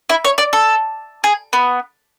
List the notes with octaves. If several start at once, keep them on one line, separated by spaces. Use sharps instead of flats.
E4
C#5
D5
A4
G#4
B3